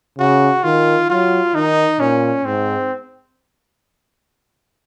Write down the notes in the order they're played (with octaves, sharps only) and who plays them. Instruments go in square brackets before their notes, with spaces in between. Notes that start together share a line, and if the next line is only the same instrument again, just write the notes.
[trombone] C#3 [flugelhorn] F#4
[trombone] D#3 [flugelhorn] F4
[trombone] F#3 [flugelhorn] F4
[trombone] D#3 [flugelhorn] D#4
[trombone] A#2 [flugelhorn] C#4
[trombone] G#2 [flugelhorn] C4